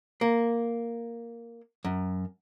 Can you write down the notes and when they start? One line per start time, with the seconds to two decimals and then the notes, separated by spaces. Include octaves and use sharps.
0.21 A#3
1.85 F#2